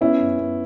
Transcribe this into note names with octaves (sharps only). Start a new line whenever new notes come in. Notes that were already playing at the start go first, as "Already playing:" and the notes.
B3 C#4 E4
F#2
B3